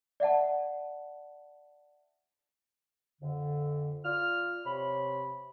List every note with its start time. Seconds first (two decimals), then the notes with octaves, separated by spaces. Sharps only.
0.20 D5 E5 F#5 A5
3.21 F2 D3
4.05 F4 D5 F6
4.66 C3 C#5 B5